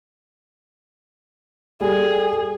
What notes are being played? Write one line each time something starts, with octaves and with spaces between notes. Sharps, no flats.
G3 G#4 A4